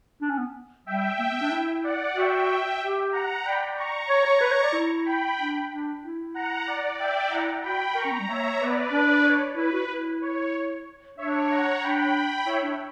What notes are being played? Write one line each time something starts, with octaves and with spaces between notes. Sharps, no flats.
D4
C#4
B3
G3 E5 G5
A#3
B3
D4
E4
D5 F#5
F#4 E5 G5
E5 G5
G4
F#5 A#5
D5 G5 B5
A#5 C#6
C#5 A#5 C#6
C#5
B4
C#5
D5
E4
G5 B5
D4
D4
E4
F#5 A#5
D5 F#5
E5 G5
E4 F#5 A#5
F#4 G5 B5
A#4 A#5 C#6
C#4
B3
G3
A#3 C#5 E5
B3 B4 D5
D4
C#5
E4 B4
F#4
E4
C#5
D4 C#5 E5
F#5 A#5
D4 G5 B5
E4 C#5 E5
D4